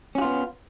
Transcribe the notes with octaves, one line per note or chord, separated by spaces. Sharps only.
B3 C#4 F4 F#4